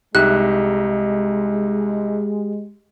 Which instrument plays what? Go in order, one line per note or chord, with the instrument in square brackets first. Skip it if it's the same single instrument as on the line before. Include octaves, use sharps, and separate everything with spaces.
[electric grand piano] C2 D#4 E5 [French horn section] G#3 [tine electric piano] G4 [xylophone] F#6